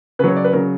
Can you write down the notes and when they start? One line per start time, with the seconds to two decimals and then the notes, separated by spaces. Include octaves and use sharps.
0.19 C#3 B4
0.24 F#3 C#5
0.36 D5
0.44 B4
0.53 C#3 F#3 A#4